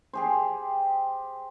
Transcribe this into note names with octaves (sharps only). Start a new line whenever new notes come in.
G4 G#4 C5